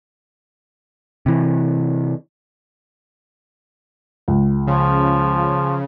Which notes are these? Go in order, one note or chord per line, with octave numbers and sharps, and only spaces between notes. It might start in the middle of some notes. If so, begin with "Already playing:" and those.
C3 E3
C#2
C#3 F3